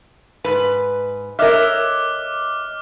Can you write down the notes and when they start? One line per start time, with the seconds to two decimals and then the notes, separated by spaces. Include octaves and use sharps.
0.44 G#2 B4
1.39 A#4 C#5 D#5 E5 D6 F6 F#6 B6